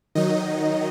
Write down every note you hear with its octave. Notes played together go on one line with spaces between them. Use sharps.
D#3 F#3 D#4 D#5